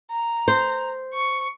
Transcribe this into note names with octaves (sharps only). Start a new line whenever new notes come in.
A#5
C5
C#6